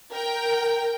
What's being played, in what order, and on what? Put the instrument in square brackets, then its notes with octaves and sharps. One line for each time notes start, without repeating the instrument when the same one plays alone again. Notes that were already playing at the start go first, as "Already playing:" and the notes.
[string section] A#4 G5